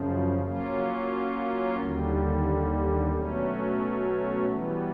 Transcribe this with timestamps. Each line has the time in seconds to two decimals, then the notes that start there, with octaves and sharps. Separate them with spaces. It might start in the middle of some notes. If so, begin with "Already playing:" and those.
Already playing: F#2 C#3 F3
0.42 F#3 A#3 C#4 F4
1.77 D#2 D3 G3
3.11 B2 F#3 A3 C#4
4.46 E3 G3 B3